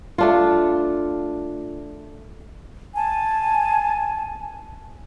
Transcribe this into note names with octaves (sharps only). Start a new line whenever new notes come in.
A3 D4 F4
G#5 A5